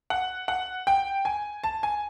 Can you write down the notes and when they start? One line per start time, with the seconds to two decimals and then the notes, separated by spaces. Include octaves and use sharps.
0.10 F#5
0.48 F#5
0.87 G5
1.25 G#5
1.64 A5
1.83 G#5